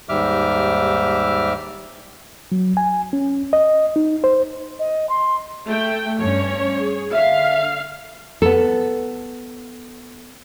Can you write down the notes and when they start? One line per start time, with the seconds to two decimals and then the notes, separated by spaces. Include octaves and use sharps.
0.09 D#2 G#2 G3 E5 D6 F6
2.52 F#3
2.77 G#5
3.13 C#4
3.53 D#5
3.96 D#4
4.24 C5
4.79 D#5
5.09 C6
5.67 A3 G5
6.19 G2 A3 C#4 C#5
6.77 G#4
7.12 D3 E5 F5
8.42 B3 A4